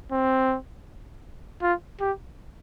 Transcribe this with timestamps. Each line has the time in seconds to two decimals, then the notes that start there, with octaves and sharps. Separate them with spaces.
0.12 C4
1.62 F4
2.00 G4